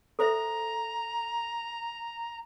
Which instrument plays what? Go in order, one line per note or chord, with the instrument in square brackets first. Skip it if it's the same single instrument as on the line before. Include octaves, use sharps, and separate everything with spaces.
[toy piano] A4 C5 E5 [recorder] A#5